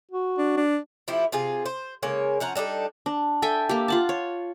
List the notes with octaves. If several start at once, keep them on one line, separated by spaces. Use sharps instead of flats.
F#4
D4
D4
F3 A3 E4 G4
C3 F4 G#4
C5
C#3 G#3 A#3 C#5
F3 C#4 F#5 A#5
G3 D4 D#4 A4
D4
A4 E5 G5 G#5
A#3 G4
F4 F#5 A5
C#5